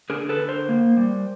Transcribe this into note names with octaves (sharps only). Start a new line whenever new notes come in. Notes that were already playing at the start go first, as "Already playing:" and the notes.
D3 G#4 A#4
A4 B4
D3
A#4 C5
A#3
G3